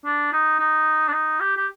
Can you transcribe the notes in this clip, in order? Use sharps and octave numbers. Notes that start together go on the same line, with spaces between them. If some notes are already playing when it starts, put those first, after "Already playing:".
D4
D#4
D#4
D4
D#4
G4
G4